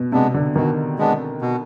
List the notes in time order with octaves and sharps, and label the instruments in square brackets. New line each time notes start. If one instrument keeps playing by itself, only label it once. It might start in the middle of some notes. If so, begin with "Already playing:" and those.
Already playing: [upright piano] B2
[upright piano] C3 [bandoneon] G#3 B3 D4
[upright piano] D3
[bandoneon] B2 [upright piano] D#3
[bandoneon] G#3 B3 D4
B2